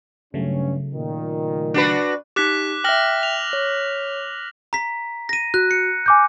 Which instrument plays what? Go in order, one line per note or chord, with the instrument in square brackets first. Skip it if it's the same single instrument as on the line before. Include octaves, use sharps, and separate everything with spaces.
[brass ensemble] G2 C#4 [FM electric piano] C#3 F#3 A3
[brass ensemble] A#2 D#3
[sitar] D4 F#4 B4
[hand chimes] D#4 G4 [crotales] D6 F#6 B6
[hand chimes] E5 G5 [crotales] F6 A#6 F#7
[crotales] F7
[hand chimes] C#5
[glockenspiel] A#5 B6
A#6 D#7
[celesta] F#4 [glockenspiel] F#6
[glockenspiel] C#7
[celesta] G#5 D6 G6